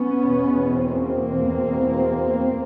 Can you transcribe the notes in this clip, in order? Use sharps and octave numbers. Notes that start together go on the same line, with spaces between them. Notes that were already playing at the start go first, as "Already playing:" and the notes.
Already playing: B3 C#4
E2 B2
A#3 C4
E2 B2